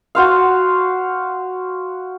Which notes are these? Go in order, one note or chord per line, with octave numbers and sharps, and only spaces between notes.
F#4 C5 F5